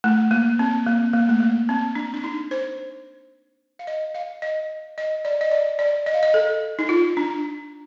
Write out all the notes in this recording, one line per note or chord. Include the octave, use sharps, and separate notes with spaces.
A3
A#3
C4
A#3
A#3
A3
A#3
C4
D4
D4
D#4
C5
F5
D#5
F5
D#5
D#5
D5
D#5
D5
D5
D#5
F5
D#5
A4
D#4
F4
D4